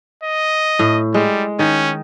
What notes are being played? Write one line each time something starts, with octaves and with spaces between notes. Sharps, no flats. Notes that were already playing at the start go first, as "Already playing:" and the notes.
D#5
A2
G3 G#3
D#3 C#4